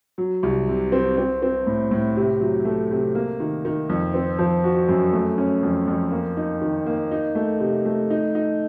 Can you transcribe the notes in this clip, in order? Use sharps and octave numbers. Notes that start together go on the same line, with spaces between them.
F#3
C2
C3
C4
C4
C4
A2
A2
C3
F#3
A3
C3
A#3
D#3
D#3
F2
C4
F3
F#4
F#2
A3
C#4
F2
F2
A#3
D#4
D#3
A#3
D#4
A3
C3
A3
D#4
D#4